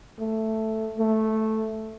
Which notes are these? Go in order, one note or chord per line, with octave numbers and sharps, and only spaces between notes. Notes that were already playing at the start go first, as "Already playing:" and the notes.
A3
A3